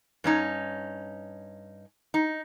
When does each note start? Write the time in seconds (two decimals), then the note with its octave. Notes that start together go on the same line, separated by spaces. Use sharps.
0.24 G2 C#4 D#4
2.14 D#4